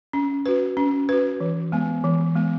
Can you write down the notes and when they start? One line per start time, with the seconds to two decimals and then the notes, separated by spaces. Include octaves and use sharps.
0.13 C#4
0.46 F#4 B4
0.77 C#4
1.09 F#4 B4
1.40 E3
1.72 G#3 B3
2.04 E3
2.36 G#3 B3